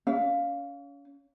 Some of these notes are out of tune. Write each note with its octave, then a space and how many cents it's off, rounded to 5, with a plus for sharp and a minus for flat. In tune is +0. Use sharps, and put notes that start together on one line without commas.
C#4 +30 F5 +0